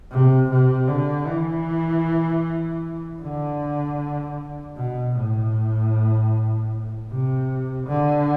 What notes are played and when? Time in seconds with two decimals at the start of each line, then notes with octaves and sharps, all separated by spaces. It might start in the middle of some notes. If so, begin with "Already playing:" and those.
0.11 C3
0.50 C3
0.88 D3
1.27 E3
3.22 D3
4.77 B2
5.16 A2
7.10 C3
7.87 D3